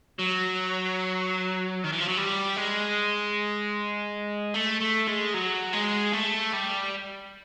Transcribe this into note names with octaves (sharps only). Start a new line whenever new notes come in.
F#3
D#3
E3
F3
F#3
G3
G#3
A3
A3
G#3
F#3
G#3
A3
G3